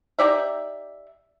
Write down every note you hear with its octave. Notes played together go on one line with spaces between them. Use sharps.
D#4 G4 D5 E5